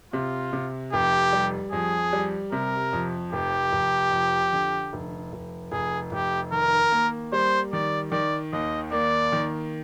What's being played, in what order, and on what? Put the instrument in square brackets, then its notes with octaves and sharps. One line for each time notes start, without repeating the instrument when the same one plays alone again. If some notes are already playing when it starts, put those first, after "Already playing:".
[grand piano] C3 [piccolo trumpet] F4
[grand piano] C3
[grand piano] F1 [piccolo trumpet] G4
[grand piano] G3
[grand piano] F2 [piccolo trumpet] G#4
[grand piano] G3
[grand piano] C3 [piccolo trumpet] A#4
[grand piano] F2
[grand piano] F1 [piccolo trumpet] G4
[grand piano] F1
F2
D3
F1
F1
[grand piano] F1 [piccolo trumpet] G#4
[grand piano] F1 [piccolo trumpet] G4
[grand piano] D#3 [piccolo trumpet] A#4
[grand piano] A#3
[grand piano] G3 [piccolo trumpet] C5
[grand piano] D#3 [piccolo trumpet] D5
[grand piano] D#3 [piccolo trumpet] D5
[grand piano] D#2 [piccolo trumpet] D#5
[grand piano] A#3 [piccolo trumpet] D5
[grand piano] D#3